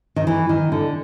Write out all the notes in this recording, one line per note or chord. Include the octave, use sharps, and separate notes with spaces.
D#3
E3
D#3
D3